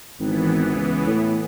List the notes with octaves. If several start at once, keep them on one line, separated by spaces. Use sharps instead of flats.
G#1 E3 B3
C#2
A2